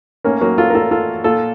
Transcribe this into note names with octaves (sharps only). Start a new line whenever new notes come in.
A2 A#3 C#4
F#3 A#3
F4 A4
A#4
A2 F4 A4
F4 A4
A#2 F4 A4